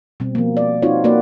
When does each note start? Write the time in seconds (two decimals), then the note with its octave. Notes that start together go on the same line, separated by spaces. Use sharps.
0.20 B2 G3 C4
0.35 F3 A#3
0.57 D5
0.82 C4 D#4 F4 F#4 C#5
1.04 A#3 F#4 B4 D5